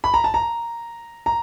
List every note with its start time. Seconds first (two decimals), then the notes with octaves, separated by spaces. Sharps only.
0.04 B5
0.14 A#5
0.24 A5
0.34 A#5
1.26 A#5